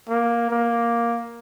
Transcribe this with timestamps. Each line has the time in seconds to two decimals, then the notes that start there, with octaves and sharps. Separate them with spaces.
0.09 A#3
0.51 A#3